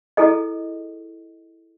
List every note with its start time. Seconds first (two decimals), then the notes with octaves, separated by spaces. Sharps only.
0.17 E4 G#4 A4 D#5